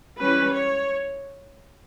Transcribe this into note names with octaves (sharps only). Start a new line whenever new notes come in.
E3 G3 C#4 B4
C#5